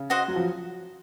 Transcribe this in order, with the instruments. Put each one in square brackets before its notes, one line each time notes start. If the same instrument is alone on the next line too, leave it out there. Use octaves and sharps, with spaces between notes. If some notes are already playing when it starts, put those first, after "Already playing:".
Already playing: [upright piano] C#3
[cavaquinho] F#4 C5 D#5 F#5
[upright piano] F#3
F3